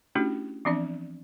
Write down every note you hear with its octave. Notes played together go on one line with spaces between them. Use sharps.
A3 C#4 D4 E4 F#4 G4
E3 F3 B3 C4 D4 D5